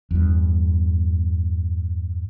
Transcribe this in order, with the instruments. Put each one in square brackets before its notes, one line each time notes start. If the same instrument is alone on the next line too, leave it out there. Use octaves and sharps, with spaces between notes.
[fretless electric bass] E2 G2